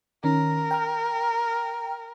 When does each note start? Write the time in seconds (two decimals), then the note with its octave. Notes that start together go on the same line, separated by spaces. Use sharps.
0.24 D#3 C#4 A#4
0.71 G5 A#5 F6